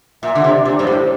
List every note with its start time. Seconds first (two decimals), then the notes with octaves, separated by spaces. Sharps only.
0.23 A#2 E5
0.35 D3
0.44 C3
0.51 D5
0.65 A#2
0.79 G2 C5
0.87 A2